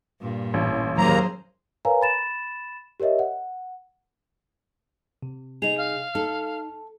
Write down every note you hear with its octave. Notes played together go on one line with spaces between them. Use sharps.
G2 A#2
A1
D#2 F#3 A#3 G#4 C5 A#5
A#4 B4 C#5 F5 G#5 A#5
B5 A6 E7
G4 A#4 C#5 D#5 E5
F#5
C3
D#4 G#4 F7
F5
D#4 A4